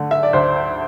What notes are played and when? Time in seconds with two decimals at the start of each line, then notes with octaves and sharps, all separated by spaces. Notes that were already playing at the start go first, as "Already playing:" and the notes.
Already playing: D3 A3
0.11 E5
0.23 D5
0.33 D2 C5